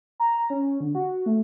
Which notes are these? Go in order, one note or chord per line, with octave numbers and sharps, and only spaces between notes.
A#5
C#4
D3
F#4
A3